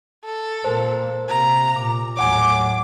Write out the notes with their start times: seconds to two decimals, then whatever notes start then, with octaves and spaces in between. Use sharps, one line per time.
0.25 A4
0.64 A#2 A#3 A#4 C5
1.29 C3 A#3 A#5
1.76 A#2 D6
2.17 D#2 A2 F#3 C#5 F#5 G#5 D6